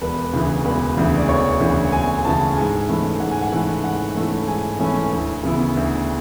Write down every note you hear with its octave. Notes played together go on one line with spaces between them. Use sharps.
E1 B4
D2 C#3 E3
E1 B4
D2 C#3 E3
D5
E1 C#5
D2 C#3 E3
E1 G#5
D2 C#3 E3 A5
G#2 G#5
E3 A3 C#4 E4
G#2 F#5
G#5
F#5
E3 A3 C#4 E4
G#2 F#5
E3 A3 C#4 E4
G#2 G#5
E3 A3 C#4 E4 G#5
D2
C#3 E3 B3 E4
D2